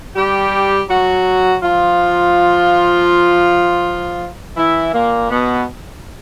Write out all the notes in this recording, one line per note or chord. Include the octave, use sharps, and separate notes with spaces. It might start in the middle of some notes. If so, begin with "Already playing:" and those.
G3 G4
F#3 F#4
F3 F4
E3 E4
A#2 A#3
B2 B3